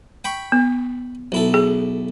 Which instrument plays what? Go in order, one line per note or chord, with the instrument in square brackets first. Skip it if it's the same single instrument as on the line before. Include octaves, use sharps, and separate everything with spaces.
[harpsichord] G5 B5 C#6
[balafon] B3
[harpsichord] B1 E4 A4
[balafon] G#4